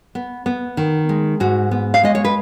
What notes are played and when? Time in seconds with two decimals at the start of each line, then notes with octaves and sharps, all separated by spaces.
0.15 B3
0.46 B3
0.77 D#3
1.09 G#3
1.40 G#2 F#4
1.71 B3
1.94 F5
2.03 G#3 D#5
2.15 C#5
2.25 B4